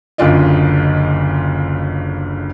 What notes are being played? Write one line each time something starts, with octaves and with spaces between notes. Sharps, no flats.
F#1 D2 C#3 F4 D5 D#5